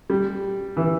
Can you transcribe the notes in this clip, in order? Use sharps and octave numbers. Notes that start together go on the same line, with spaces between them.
G3
E3